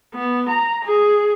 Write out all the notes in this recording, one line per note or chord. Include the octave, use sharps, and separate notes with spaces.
B3
A#5
G#4